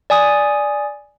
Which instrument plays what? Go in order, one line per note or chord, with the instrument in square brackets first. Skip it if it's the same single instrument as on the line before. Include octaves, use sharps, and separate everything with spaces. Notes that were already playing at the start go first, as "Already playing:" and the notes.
[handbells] D5 G#5 D#6